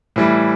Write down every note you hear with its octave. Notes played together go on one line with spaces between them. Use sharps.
A2 E3 G3